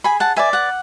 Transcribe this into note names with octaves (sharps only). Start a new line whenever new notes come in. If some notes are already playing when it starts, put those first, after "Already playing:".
G#4 G#5 B5
F#5 A5
B4 D5 E5 G#5
F#5